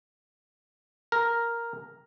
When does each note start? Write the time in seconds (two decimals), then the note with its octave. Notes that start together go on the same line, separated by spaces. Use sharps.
1.12 A#4